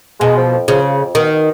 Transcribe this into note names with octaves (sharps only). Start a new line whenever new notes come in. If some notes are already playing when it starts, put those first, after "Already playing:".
B2 G#3
F3
F2
C#3 F3
F3
F2
B2 D#3
B2